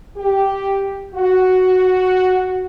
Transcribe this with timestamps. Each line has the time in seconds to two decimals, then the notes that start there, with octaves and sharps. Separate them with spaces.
0.17 G4
1.15 F#4